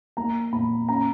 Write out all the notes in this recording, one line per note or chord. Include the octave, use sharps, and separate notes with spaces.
A#3 A#5
A#2 B5
C#4 A#5